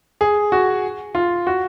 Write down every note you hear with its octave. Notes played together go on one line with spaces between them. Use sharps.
G#4
F#4
F4
F#4